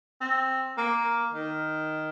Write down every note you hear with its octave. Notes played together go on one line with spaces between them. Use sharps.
C4
A#3
D#3